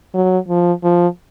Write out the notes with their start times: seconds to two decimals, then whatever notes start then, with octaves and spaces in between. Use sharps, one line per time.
0.14 F#3
0.48 F3
0.83 F3